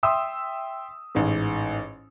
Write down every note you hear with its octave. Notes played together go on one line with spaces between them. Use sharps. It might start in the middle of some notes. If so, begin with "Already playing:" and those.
E5 G5 C6 D#6 E6
A1 G#2